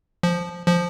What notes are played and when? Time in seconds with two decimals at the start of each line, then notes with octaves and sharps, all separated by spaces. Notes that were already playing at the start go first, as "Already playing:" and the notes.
0.23 F3
0.68 F3